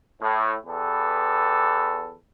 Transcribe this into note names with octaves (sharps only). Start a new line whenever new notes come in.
A2
E2 G4 A4 B4